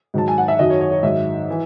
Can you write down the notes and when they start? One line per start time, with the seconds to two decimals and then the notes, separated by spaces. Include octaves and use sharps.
0.14 G#2 D#3 F#3 A5
0.28 G#5
0.38 F#5
0.48 E5
0.59 F#2 D#3 F#3 D#5
0.70 C#5
0.81 C#5
0.92 C#5
1.03 G#2 D#3 F#3 E5
1.50 E3